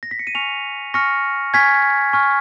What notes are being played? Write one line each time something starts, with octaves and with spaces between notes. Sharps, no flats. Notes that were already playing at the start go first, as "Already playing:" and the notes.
A#6
B6
C#7
D#7
G#5 C#6 F6 C#7 F7
G#5 C#6 F6 A#6 C#7
G#5 C#6 F6 G#6 B6
G#5 C#6 F6